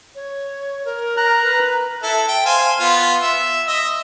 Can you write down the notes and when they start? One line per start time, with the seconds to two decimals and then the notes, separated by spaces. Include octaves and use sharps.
0.15 C#5
0.85 A#4
1.17 A#5 F#6
1.44 B4
2.03 E4 A4
2.28 G5
2.46 C5 F5 G#5
2.80 B3 F4
3.22 E5
3.67 D#5 E5